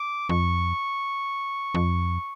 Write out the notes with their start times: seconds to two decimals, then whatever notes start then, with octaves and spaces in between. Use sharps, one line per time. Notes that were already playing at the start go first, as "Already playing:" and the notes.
Already playing: D6
0.29 F2 C#6
1.75 F2